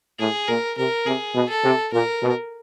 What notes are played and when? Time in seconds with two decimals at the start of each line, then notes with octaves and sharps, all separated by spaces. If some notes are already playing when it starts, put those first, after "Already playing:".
0.19 A2 G#4
0.48 A#2 A#4
0.78 C3 A#4
1.06 C3 G#4
1.35 B2
1.49 A4
1.64 C3
1.93 A#2 A#4
2.23 B2